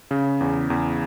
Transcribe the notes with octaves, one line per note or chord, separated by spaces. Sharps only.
C#3
E2
E2